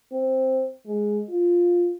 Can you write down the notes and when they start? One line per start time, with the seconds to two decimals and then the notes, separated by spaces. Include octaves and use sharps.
0.12 C4
0.86 G#3
1.30 F4